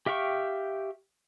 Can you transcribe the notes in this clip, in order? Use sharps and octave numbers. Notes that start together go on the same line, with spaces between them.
G4 E5 F5 G5 C#6